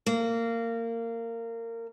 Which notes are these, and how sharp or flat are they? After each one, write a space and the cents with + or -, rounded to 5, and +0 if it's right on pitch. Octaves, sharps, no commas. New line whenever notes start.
A#3 -20